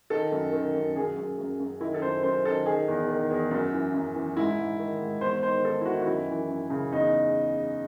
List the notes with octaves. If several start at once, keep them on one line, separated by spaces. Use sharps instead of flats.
D#3 A4
F#2
D#3
F#2
F#2 G#4
F#2
F#2
F#2
D#3 E4
A4
F#2 C5
F#2 C5
D#3 A4
D#3 G#4
E2
D#3
E2
F#2
E3
F#2
E3
G#2 E4
G#2
D#3
G#2
E2 C5
D#3 C5
D#3 A4
E4
D#3 F#4
F#4
F#2 E4
E3
F#2
C#3
E2 D#4